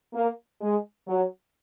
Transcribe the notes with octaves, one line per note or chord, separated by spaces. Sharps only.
A#3
G#3
F#3